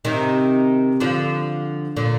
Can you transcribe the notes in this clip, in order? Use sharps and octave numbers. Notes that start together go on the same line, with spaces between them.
C3 D#3
D3 F3
A#2 D3